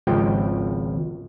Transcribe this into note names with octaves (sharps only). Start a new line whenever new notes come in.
G#1 C#2 F3 G5